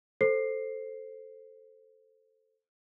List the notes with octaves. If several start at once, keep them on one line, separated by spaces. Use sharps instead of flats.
A4 C5 C7